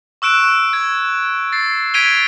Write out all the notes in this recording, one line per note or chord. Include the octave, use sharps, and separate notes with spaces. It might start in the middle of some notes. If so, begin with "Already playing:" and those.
C#6 E6 F#6 D7 E7
G#6
A6 C7
G#6 B6 D7 D#7 F7 G7